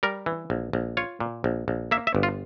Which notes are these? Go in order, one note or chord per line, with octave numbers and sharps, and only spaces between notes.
G3 A#4
E3
A#1
A#1
F4 C#5
A#2
A#1
A#1
A#3 E5
E5
G1
F4